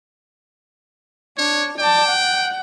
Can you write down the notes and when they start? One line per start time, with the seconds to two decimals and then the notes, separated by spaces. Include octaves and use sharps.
1.38 D4 C#5
1.79 D5 G5 A5
2.09 F#5